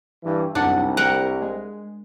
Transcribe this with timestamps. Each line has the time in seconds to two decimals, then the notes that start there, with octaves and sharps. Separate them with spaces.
0.24 G2 E3
0.55 C2 F#2 D4 D#4 F#5
0.97 A#4 F#5 G5
1.42 G#3